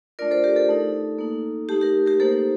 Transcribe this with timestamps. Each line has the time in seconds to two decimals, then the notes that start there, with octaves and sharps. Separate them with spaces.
0.19 A3 D4 F4 A#4 D5
0.31 A4 C5
0.44 G4 A#4
0.56 A4
0.69 A3 D#4
1.18 A#3 D#4
1.69 A3 D#4 G4
1.81 G4 A#4
2.06 G4 A#4
2.20 A#3 D#4 A4 C5